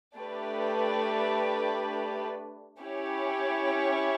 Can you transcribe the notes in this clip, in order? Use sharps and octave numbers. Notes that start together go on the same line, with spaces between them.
A3 D4 G4 B4
C#4 E4 G4 C#5